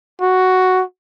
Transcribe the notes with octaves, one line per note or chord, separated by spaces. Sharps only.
F#4